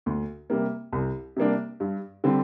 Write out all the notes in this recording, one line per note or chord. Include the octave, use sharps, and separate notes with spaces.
D2
C3 G3 A#3
C2
C3 G3 A#3 D4
G2
D3 G3 C4